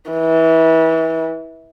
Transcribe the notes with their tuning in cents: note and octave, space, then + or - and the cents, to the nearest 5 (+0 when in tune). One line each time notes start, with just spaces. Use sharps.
E3 -25